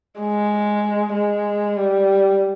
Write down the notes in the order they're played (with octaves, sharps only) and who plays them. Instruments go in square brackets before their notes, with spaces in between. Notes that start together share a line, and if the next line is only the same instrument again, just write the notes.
[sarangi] G#3
G#3
G3